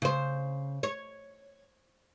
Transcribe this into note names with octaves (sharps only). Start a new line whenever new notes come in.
C#3 C5
C#5